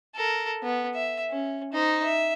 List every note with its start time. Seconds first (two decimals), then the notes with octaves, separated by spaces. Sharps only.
0.15 A4 A#4
0.63 B3
0.95 E5
1.30 C#4
1.73 D#4 C5
2.04 E5